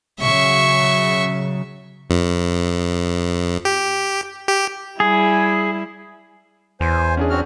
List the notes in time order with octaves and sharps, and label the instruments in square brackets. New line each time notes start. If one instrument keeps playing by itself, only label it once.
[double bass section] C#3 F#3 [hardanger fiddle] E5 C#6
[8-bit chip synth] F2
G4
G4
[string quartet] G3 E4 [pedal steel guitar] G#4
[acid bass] E2 [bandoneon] C5 G#5
[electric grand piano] C#4 D4 G#4
[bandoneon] C4 F#4 F6